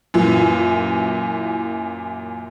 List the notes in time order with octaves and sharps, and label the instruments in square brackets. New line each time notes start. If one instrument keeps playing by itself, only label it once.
[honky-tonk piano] F#2 A#2 E3